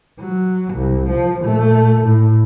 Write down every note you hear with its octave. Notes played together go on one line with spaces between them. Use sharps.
F#3
C2
F3
A#2 A3
A2